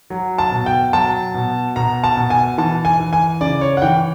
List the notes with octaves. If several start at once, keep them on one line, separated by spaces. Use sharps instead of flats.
F#3
A5
B2
G5
F#3 A5
B2
B2 A#5
A5
B2
G#5
E3 A5
G#5
E3
G#5
C#3 D5
C#5
F#5
E3 G5